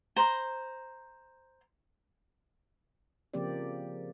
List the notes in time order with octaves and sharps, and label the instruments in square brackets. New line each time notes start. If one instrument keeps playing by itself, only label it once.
[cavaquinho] C5 A#5
[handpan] C#3 F3 A#3 C4 G4 D5